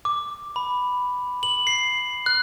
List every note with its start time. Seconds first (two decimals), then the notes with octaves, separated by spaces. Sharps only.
0.05 D6
0.56 B5
1.43 F#7
1.67 C7
2.26 F#6